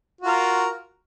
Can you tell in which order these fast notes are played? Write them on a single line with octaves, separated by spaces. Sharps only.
F#4 F4 A#4